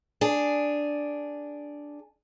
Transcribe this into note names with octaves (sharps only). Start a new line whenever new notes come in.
D4 G#4